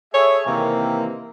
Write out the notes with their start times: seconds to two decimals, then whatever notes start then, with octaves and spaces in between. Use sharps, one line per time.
0.14 G#4 A4 C#5 E5
0.46 C3 D#3 E3 A#3 C4